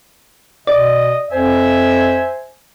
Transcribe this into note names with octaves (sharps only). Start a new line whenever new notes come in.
B2 D5 D#5
F2 C5 E5 G#5